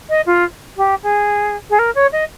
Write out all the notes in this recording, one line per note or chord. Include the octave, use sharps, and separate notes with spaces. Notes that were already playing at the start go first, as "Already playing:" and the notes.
D#5
F4
G4
G#4
G#4
A#4
C#5
D#5